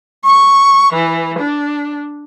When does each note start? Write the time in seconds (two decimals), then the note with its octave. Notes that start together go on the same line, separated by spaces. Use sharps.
0.24 C#6
0.94 E3
1.39 D4